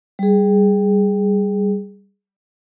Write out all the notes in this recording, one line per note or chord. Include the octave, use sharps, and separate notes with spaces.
G3 G#4